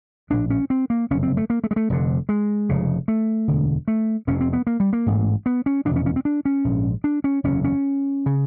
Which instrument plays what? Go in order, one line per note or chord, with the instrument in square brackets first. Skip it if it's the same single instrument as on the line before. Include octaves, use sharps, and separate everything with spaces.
[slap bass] A#1 A2 D4
C#4
C4
A#3
F#1 F2 C3 C#4
C4
A3
A#3
A3
G#3
A3
F1 F2 D3
G#3
F1 F2 C#3
A3
E1 D2 D3
A3
F1 F2 C3 C#4
C4
B3
A#3
G3
A#3
A1 G#2
B3
C#4
F1 E2 B2 D4
C#4
C#4
C4
D4
C#4
A#1 G#2
D4
C#4
F#1 E2 C3 C#4
C#4
C#3